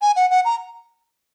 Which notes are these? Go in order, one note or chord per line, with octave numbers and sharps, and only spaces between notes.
G#5
F#5
F#5
A#5